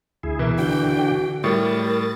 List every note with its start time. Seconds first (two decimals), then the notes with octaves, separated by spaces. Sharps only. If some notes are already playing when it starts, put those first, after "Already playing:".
0.23 D2 E4 G#4
0.39 B2 E3 A#4 E5
0.59 D3 F#4 G5
1.44 A2 G3 A#4 A6